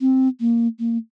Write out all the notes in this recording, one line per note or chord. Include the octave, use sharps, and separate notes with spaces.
C4
A#3
A#3